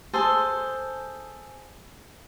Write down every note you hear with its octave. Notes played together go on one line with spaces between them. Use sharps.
G#4 A4 C5